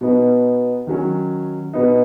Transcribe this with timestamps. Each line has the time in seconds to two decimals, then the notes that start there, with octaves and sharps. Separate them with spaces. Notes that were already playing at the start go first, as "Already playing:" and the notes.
0.01 B2 B3 D#4
0.87 D#3 F#3 C#4
1.73 B2 B3 D#4